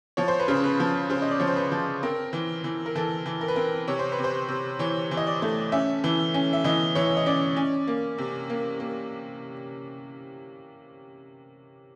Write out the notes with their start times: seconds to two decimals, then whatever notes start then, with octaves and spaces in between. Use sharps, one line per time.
0.17 F3 C#5
0.28 C5
0.40 B4
0.48 C#3 C5
0.64 B4
0.80 F3
1.10 C#3 C5
1.22 D#5
1.31 D5
1.40 F3 C#5
1.47 C5
1.56 B4
1.72 F3
2.03 C4 A#4
2.33 E3
2.64 E3
2.86 A#4
2.95 E3 A4
3.26 E3
3.41 A#4
3.48 B4
3.56 C4 A#4
3.88 C3 C#5
3.99 C5
4.12 B4
4.19 C3
4.24 C5
4.48 C3
4.79 E3 C#5
5.11 E3
5.17 D#5
5.27 D5
5.42 A3
5.72 C#4 E5
6.04 E3
6.34 C#4
6.53 E5
6.64 E3 D#5
6.95 E3 C#5
7.17 D#5
7.26 C#4 D5
7.57 C#4
7.87 A#3
8.18 C3
8.50 A#3
8.80 A#3